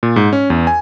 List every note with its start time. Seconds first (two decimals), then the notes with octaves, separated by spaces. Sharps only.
0.03 A#2
0.16 G#2
0.33 C#4
0.50 E2
0.67 G#5